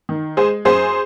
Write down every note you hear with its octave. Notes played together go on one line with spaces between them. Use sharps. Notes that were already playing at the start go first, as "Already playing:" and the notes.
D#3
G#3 G#4 C5
F#2 G#4 C5